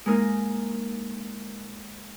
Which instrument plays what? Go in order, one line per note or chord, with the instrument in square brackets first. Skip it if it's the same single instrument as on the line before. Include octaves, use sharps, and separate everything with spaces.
[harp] G#3 A#3 D#4 A#4